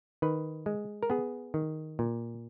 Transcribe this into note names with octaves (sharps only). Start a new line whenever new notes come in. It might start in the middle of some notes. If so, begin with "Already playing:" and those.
D#3 B4
G#3
A#4
B3 G#4
D#3
A#2